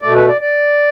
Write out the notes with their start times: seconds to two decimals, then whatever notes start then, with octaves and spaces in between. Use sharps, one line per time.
0.02 B2 A3 D5
0.14 B4
0.28 D5
0.41 D5